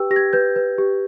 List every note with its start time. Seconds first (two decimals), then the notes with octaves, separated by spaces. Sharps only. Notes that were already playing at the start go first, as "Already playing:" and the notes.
Already playing: G4 B4 G5 E6
0.11 G4 A#6
0.16 G#6
0.33 B4 G6
0.56 B4
0.78 G4